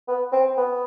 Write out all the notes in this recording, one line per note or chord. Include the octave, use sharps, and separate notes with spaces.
B3
C4
B3